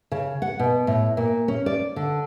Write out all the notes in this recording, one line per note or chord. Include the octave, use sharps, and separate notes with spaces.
C#3
F#5
B2
A2
A#2
C#4
D5
D3